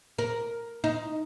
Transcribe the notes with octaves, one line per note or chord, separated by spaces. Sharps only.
A#4
D#4